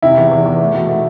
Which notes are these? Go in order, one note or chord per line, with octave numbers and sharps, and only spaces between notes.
C3 E4
E2
E2
E2
A3
B2
A3